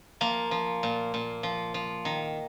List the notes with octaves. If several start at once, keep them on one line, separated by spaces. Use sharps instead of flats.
F3 A#3
F3
A#2
A#2
F3
F3
D#3